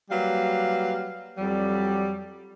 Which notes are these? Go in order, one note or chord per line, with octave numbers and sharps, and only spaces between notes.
F#3 G3 A#3 B4 F5
F2 F#3 G3